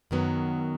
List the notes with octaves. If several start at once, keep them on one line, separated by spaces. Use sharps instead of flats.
F#2 D#3 F#3 B3